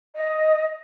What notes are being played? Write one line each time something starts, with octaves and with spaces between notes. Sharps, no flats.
D#5